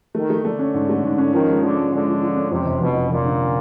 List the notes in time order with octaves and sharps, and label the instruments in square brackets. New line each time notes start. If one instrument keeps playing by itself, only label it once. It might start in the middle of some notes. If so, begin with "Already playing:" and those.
[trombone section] D#3 [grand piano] A3
[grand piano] A3
[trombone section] D3 [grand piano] A3
[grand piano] C#4
G#2
A3
G#2
C#4
[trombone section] D#3 [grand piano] F3
[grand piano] G#3
[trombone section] D3 [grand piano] F3
[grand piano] G#3
[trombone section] D3 [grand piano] G#3
[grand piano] F3
F3
C#4
[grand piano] F2 [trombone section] C3
[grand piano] F1
[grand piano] F1 [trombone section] B2
[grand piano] F2
[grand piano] F1 [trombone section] A#2
[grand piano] D3